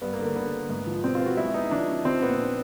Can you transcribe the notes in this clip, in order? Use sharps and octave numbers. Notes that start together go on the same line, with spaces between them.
G2 B3
A#3
D3
A#3
D3 B3
D3
G#2
F3
B2 C4
B3 F4
F#4
G#3 E4
B3 D#4
F3 D4
C#4
F3 C4
A#2 B3
D4